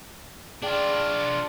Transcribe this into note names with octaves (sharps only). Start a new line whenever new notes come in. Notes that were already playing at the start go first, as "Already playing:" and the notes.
D4 F4 G#4 D5 G5